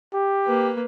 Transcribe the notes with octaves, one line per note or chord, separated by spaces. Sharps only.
G4
A#3 B4